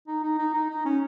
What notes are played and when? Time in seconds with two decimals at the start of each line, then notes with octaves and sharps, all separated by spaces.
0.07 D#4
0.23 D#4
0.38 D#4
0.54 D#4
0.70 D#4
0.85 C#4